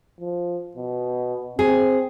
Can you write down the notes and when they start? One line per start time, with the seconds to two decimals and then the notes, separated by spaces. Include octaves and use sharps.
0.21 F3
0.77 B2
1.59 C4 G#4